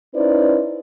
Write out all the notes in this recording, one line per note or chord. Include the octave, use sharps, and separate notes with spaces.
C#4 D#4 E4 B4 C5 D5